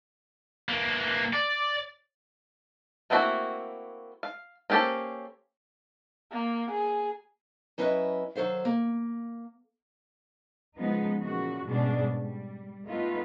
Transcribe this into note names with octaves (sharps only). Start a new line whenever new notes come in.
E3 A#3
D5
A3 A#3 C4 E4 F#4
F5
A#3 C#4 G4 A4 C5
A#3
G#4
F#3 C#4 E4 B4 D#5 E5
D#3 F#3 A4 C5 F5
A#3
C#3 F3 G#3 B3 D#4
A#2 C#3 E3 F#4
G#2 B2 G3 C#4 D4 G#4
G3
A3 B3 D#4 F4 B4